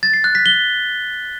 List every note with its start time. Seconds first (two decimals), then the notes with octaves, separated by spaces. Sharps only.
0.03 A6
0.14 C7
0.24 F#6
0.35 B6
0.46 G7